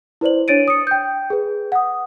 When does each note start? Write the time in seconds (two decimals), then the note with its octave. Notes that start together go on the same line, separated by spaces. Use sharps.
0.21 E4 B4 C5 D5 F#7
0.48 D4 C#5 A6 D7 D#7
0.68 D#6 C#7
0.87 G5 G6
1.30 G#4 B4
1.72 F#5 D#6